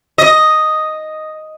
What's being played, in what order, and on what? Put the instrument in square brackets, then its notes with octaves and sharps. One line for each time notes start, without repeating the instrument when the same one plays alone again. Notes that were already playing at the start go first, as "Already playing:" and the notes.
[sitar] D#5